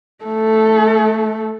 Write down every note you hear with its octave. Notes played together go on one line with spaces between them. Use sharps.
A3 A4